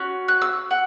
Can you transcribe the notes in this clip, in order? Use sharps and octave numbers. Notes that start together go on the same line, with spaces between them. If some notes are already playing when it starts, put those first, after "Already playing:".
Already playing: C#4 F#4
F#6
E6
F#5